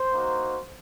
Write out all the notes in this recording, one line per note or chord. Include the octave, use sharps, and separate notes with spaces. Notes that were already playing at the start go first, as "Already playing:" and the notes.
Already playing: C5
A#3 D#4 F#4